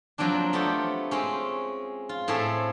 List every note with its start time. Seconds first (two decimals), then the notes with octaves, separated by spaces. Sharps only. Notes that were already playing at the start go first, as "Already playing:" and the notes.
0.18 F3 F#3 A#3 C4 D4
0.53 A3 B3 C4 F4 G4
1.11 G#3 C4 C#4
2.09 F4
2.28 A2 C4 G#4 A4 E5